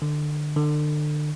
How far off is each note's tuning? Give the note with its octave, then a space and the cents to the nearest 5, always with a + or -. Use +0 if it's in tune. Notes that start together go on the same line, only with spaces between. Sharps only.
D3 +25
D3 +35